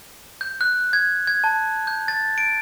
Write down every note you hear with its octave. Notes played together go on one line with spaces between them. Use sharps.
G6
F#6
G#6
G#6
A5
G6
A6
D7